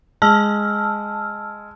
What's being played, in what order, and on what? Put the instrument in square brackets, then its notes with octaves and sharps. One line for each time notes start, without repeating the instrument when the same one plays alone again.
[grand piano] G#3 [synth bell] A5 E6 F6